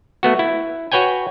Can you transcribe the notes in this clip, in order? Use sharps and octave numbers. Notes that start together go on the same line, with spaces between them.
A3 B3 F#4
E4
F#4 B4 C#5 G5 G#5